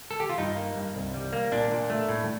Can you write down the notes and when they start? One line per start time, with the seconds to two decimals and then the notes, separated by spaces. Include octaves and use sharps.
0.11 A4
0.20 G4
0.29 F4
0.38 G2 D#4
0.56 A#3
0.76 G2
0.95 C2
1.14 G3
1.33 A#3
1.52 A#2 D4
1.72 A#2
1.90 A3
2.09 A2